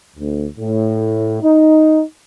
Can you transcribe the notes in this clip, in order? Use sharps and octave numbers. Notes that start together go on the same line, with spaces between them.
D2
A2
D#4